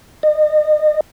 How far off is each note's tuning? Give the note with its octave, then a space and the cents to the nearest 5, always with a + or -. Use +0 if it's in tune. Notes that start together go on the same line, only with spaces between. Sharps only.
D#5 -35